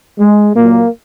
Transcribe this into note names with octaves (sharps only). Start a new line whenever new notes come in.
G#3
A#2 F#3 A#3